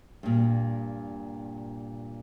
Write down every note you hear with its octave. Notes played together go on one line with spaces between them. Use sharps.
G2 A#2